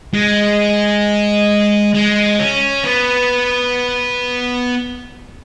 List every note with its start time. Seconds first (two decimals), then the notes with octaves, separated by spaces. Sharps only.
0.14 G#3
1.94 G#3
2.39 C#4
2.84 B3